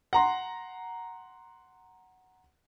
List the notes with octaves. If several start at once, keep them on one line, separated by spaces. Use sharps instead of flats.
F#5 A#5 C6